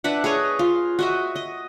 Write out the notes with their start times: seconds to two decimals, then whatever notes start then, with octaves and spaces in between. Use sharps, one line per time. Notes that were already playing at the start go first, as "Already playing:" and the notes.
0.04 D4 B4 E5 F#5
0.24 G#4 B4 C#5 D#5
0.59 F4
0.99 F#4 D#5 E5
1.36 D#5